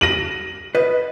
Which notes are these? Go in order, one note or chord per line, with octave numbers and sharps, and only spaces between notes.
A#6 D#7 F#7
B4 D#5